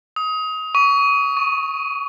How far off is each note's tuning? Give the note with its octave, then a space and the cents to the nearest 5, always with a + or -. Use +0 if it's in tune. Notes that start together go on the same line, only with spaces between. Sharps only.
D#6 +25
C#6 +30
C#6 +0